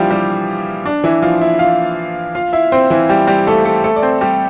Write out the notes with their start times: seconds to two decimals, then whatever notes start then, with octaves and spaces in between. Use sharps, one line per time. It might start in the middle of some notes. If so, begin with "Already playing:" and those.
Already playing: E3 F3 G3 D4 E4 F4 G4
0.10 G3 G4
0.86 D4
1.04 E3 E4
1.22 F3 F4
1.41 E4 E5
1.59 F4 F5
2.35 F4 F5
2.53 E4 E5
2.72 C4 C5
2.90 E3 E4
3.09 G3 G4
3.27 G3 G4
3.47 A3 A4
3.65 A3 A4
3.84 A3 A4
3.96 D5
4.02 C4 C5
4.21 G3 G4